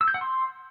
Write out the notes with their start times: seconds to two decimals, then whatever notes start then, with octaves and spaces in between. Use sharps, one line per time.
0.01 E6
0.08 G6
0.14 F#5
0.21 C6